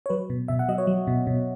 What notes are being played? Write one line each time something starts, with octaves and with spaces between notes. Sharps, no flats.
C#5
F#3 B4
B2
B2 E5
F#5
F#3 D#5
C#5
F#3
B2
B2